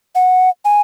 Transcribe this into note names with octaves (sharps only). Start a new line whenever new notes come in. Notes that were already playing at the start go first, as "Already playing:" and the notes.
F#5
G#5